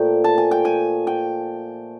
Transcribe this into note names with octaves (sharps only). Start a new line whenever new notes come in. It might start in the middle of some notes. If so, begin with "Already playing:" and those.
Already playing: A#2 F3 A3 G5
A5
G#5
G5
G#5
G5